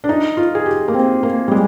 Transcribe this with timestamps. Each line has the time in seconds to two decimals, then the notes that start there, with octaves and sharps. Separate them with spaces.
0.04 D4
0.09 D#4
0.37 F4
0.55 G#4
0.66 G4
0.88 A#3
0.94 C4
1.23 A#3
1.48 G3
1.52 G#3